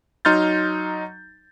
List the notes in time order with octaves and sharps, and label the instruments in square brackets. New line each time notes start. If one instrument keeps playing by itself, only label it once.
[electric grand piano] F#3 D#4 C6 F6 G6 A6